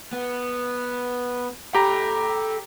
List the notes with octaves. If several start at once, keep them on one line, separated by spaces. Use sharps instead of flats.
B3
G4 A4 A#5 B5